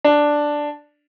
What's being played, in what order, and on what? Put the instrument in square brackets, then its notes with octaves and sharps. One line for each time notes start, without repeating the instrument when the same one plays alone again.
[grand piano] D4